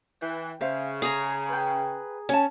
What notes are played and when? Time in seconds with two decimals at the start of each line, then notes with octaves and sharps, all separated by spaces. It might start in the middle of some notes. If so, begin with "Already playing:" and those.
0.21 E3 G5
0.61 C#3 C5 E5 F5
1.02 G#4 A#5
1.49 B4 G5
2.29 C#4 C#5 A5